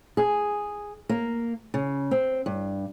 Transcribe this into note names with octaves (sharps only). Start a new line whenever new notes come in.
G#4
A#3
C#3
C4
G2